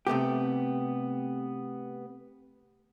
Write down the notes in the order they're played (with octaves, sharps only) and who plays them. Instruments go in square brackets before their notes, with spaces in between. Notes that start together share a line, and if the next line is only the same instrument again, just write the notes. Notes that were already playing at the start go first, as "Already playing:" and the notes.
[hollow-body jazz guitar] C3 A3 B3 G4